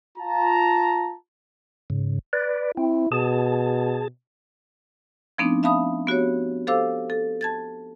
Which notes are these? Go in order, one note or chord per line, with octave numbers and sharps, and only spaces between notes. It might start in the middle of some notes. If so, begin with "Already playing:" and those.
F4 A5 A#5
G#2 C#3
B4 D5
C4 E4
B2 G#4 A5
F3 A3 B3 C4 D4 D#4
E5 F5 A5 B5 D#6
B3 F#4 G4 C#5
G4 A4 C5 F5 D6 E6
A4
A5 G#6 A6